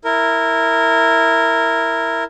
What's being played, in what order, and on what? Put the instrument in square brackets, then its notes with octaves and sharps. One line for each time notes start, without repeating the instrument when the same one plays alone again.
[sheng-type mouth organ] E4 A#4